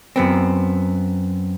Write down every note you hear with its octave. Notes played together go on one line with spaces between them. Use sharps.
F#2 B3 C4